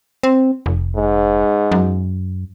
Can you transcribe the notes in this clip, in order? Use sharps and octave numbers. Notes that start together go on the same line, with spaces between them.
C4
F1
G#2
F#2